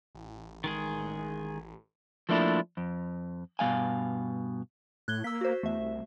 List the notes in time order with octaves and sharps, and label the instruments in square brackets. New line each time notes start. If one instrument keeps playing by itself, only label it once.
[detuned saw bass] A1
[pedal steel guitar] D#3 G#3 G#4
[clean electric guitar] F3 A3 A#3 D4 E4
F2
G2 B2 G#3 F5 G#5
[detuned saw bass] A2 [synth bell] F#6 G#6 G7
[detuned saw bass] A#3 [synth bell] E6 B6
[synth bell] F#4 C5
[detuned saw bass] E2 [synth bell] A3 E5
[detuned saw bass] C2